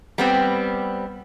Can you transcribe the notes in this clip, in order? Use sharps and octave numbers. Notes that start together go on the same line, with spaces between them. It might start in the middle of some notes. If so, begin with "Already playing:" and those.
G3 B3 C4